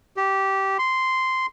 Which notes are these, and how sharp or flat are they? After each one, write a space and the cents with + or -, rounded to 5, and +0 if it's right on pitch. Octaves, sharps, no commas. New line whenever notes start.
G4 -15
C6 -10